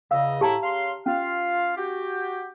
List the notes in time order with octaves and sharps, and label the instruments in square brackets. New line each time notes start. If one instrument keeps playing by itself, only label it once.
[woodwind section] E2 C#3 D#5 [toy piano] F5 E6
[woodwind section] A2 E4 [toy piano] G4 A5 A#5
[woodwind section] C#3 F5 C6
[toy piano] C#4 [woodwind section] F4 F5
[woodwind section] F#4 G4